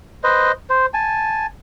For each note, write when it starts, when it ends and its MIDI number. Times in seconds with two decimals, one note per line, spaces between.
0.24 0.52 71
0.24 0.52 72
0.24 0.52 75
0.70 0.86 72
0.94 1.46 80
0.94 1.46 81